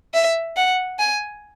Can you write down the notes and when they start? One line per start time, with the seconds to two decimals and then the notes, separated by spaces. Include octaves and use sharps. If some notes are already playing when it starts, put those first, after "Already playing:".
0.14 E5
0.57 F#5
0.99 G#5